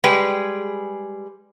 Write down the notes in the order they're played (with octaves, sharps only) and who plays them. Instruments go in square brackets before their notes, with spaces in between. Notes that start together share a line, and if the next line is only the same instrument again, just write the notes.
[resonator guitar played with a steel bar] G3 G#3 G#4 B4 G5